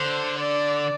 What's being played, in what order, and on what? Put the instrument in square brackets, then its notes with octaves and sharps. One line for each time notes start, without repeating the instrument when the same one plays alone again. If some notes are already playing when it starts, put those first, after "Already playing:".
Already playing: [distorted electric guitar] D3 [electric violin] C5
[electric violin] D5